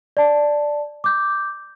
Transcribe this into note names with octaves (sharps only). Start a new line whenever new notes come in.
D5 A5
D6 G6